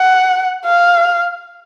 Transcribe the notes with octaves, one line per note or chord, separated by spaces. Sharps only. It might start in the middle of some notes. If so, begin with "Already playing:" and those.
Already playing: F#5
F5